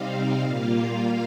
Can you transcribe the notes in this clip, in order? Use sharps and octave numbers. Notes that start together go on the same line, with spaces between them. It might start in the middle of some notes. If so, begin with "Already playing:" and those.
Already playing: C3 G3 C4 D#4 F5
A#2 G3 A#3 F4